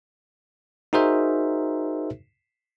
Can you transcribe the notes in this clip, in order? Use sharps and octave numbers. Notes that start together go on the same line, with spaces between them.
D#4 F#4 G#4 A#4 C5 E5